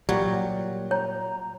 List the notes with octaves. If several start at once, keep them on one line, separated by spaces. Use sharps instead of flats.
A#2 F#3 G3
C#5 A#5